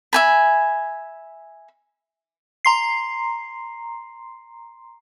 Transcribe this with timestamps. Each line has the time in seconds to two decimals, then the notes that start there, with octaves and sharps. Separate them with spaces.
0.13 E5 G#5 B5
2.65 A#5 C6 C7